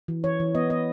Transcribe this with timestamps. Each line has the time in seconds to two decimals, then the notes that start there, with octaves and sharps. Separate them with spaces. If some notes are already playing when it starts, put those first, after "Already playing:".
0.08 E3
0.24 E3 C#5
0.40 E3
0.55 B3 D#5
0.70 B3 D#5